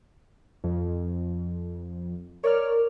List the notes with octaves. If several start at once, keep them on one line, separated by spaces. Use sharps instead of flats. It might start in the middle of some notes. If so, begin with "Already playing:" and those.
F2
A#4 C#5 D5 F6